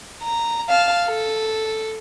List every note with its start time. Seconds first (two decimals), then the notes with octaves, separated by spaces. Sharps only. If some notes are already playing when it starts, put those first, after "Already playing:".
0.23 A#5
0.69 F5 A5
1.07 A4